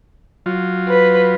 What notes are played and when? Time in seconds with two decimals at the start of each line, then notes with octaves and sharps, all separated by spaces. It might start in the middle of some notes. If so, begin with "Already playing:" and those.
0.46 F#3 F4
0.88 B4